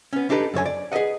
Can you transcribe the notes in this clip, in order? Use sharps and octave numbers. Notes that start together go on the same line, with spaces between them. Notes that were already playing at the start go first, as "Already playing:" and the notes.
B3 C#4
D4 D#4 G4 A4 B4
F#2 D3 C#5 G#5
D5
G#4 B4 D5 D#5 F#5